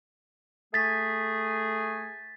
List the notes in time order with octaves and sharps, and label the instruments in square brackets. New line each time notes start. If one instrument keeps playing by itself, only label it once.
[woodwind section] A3 G#4 [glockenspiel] A6 B6